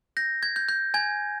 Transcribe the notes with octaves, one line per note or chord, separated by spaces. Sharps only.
G6 A#6
G#6
G6
G6
G#5 G#6